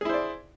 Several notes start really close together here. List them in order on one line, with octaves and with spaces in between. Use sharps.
G#4 E4 C5 D5